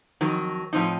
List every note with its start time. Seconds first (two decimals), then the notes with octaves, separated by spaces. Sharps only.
0.21 F2 D#3 F#3
0.73 A2 F3 C4 D#4